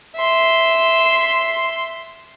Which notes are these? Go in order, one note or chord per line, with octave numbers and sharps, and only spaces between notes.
E5 C6